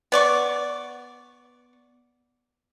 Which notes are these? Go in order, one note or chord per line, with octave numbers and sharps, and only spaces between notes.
B3 D5 C#6